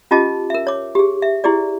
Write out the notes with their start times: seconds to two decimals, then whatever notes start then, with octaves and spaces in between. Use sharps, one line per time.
0.11 C#4 F4 G4 D#5 A5 D6
0.50 A#4 E5
0.67 C#5 D6
0.95 G4 G#4
1.22 E5
1.44 E4 G4 G#4 D5